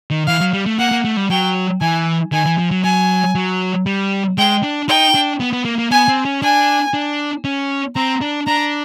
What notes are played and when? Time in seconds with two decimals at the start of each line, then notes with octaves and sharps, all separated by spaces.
0.11 D#3
0.27 E3 F5
0.41 F#3
0.53 G3
0.66 A3
0.79 A#3 F#5
0.91 A#3
1.05 A3
1.17 G3
1.30 F#3 G5
1.81 E3 G#5
2.33 D#3 G#5
2.46 E3
2.58 F3
2.71 F#3
2.84 F#3 G#5
3.35 F#3
3.86 G3
4.38 G#3 G5
4.63 D4
4.88 D#4 G5
5.15 D4
5.40 B3
5.53 B3
5.65 A#3
5.78 A#3
5.91 B3 G#5
6.08 C4
6.25 C#4
6.42 D4 G#5
6.94 D4
7.45 C#4
7.96 C4 A#5
8.21 D4
8.47 D4 A#5